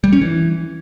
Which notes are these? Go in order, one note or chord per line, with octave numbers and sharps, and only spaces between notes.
G3
C#4
E3